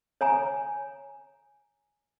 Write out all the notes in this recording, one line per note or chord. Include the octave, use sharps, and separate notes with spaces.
C#5 G#5 A#5